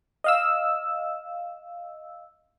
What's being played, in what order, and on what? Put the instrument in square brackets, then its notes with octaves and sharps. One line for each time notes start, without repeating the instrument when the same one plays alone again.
[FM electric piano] D#5 F5 E6